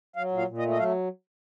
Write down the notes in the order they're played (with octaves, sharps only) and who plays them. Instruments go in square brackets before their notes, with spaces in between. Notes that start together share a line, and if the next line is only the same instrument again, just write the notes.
[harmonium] F#3 F5
A#2
F5
A#2
D#5
A3
D#5
F#3 F5